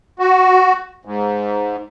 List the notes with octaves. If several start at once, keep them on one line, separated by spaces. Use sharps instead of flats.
F#4
G#2